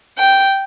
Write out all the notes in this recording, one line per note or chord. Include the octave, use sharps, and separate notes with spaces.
G5